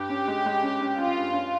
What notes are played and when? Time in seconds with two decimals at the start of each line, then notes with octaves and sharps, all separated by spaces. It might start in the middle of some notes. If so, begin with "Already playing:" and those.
Already playing: G2 G4
0.10 C#4
0.28 G#3
0.46 G#3
0.63 C#4
0.81 C#4
0.98 C#4 F4
1.16 G2
1.34 C#4